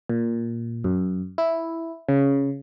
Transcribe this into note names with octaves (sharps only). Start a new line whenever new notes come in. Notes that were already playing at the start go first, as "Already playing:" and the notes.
A#2
F#2
E4
C#3